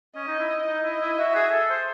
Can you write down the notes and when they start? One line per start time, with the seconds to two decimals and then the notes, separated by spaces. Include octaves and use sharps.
0.15 C#4 D#5
0.28 D#4
0.39 E4
0.67 D#4
0.84 E4 D#5
1.01 E4
1.13 E4
1.18 F#4 E5
1.35 G#4
1.52 A4
1.70 C5